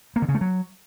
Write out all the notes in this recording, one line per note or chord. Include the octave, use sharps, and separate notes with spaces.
A#3
D3
C#3
A3
F#3